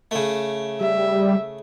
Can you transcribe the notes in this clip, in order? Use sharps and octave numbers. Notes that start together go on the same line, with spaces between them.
C#3 A3
G3 E5